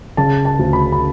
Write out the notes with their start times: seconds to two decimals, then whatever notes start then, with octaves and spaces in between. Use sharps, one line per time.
0.17 C#3 A5
0.45 A5
0.59 D2
0.73 B5
0.92 B5